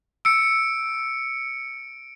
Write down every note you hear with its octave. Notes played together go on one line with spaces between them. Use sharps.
E6 C#7 D7